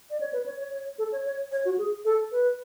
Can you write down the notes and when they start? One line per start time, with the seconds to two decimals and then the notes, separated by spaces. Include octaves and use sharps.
0.10 D5
0.20 C#5
0.33 B4
0.46 C#5
0.59 C#5
0.73 C#5
0.98 A4
1.12 C#5
1.26 C#5
1.52 C#5
1.65 F#4
1.78 G#4
2.05 A4
2.32 B4